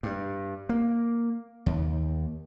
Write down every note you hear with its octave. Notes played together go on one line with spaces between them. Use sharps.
G2
A#3
D#2